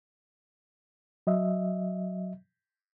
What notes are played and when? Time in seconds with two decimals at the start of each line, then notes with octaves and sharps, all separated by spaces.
1.27 F#3 D#5 E5